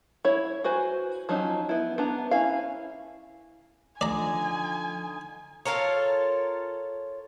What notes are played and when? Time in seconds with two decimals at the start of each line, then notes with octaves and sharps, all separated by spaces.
0.25 E4 C#5
0.64 F#4 B4 C5 G#5
1.29 F3 F#3 C#4 D#4
1.69 B3 E4
1.98 B3 D4 A#5
2.31 C#4 E4 F5
4.01 D3 F3 D#4 D5 G#5 A#5
5.65 F4 A4 A#4 C#5